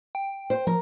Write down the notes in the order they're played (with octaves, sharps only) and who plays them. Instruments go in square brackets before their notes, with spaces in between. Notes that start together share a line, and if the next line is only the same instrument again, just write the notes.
[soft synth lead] G5
[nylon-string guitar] C5
[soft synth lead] F3 [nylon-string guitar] A#4